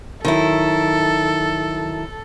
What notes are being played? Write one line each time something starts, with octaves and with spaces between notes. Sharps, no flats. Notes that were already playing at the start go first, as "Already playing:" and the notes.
D#3 F#3 E4 A4